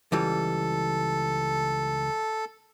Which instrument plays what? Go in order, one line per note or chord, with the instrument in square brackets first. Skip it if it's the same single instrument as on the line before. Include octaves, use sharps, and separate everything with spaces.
[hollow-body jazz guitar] C#2 E3 G3 [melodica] A4